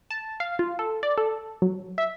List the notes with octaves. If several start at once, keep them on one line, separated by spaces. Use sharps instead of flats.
A5
F5
F4
A4
D5
A4
F#3
E5